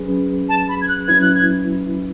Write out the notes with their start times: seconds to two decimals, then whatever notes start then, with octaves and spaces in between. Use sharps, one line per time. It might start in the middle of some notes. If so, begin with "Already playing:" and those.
Already playing: F#3 C#4 G#4 B4
0.49 A5
0.69 B5
0.81 G#6
0.88 F#6
1.08 F#3 C#4 E4 B4 G#6
1.22 F#6
1.35 G#6